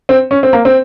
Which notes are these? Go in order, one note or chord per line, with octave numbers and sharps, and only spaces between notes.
C4
C#4
C4
A#3
C4